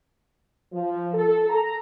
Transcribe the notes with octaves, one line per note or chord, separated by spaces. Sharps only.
F3
A4
A#5